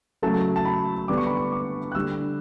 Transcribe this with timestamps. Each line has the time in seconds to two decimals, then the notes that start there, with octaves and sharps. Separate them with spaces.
0.22 C#3 F#3 A3 A5
0.56 A5
0.65 B5
1.08 D3 G3 B3 D4 D6
1.18 C#6
1.27 B5
1.37 C#6
1.52 D6
1.92 F#6
1.95 D3 G3 D4 E6